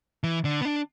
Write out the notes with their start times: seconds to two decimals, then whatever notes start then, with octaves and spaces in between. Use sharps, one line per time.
0.24 E3
0.45 D3
0.61 B3
0.65 D4